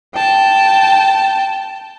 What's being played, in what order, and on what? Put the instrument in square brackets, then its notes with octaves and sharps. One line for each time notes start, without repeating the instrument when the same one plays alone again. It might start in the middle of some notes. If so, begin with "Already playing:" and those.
[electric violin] G5 A5